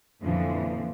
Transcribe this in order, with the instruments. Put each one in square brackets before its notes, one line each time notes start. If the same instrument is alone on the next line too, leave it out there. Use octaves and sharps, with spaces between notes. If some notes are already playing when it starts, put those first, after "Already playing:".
[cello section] F2 A#2 D3 E3 F3